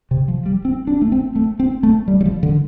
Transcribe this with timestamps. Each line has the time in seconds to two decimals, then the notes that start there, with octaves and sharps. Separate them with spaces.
0.11 C3
0.28 F3
0.46 G3
0.65 C4
0.87 D4
1.02 A3
1.12 C4
1.36 A3
1.60 C4
1.83 A3
2.08 G3
2.21 G3
2.26 F3
2.43 D3